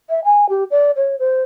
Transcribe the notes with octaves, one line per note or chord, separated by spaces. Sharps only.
E5
G#5
G4
D5
C#5
C5